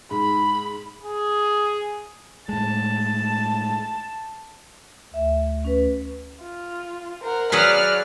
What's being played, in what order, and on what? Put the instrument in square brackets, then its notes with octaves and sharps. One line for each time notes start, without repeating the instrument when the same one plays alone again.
[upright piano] G#2 [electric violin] B5
[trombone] G#4
[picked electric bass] A2 G#3 [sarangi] A5
[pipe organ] D2 [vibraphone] E5
[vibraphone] C#4 B4
[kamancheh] F4
[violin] A#4 [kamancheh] C5 F#5
[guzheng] F#3 G#4 B4 [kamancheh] D5 F#6 [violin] F6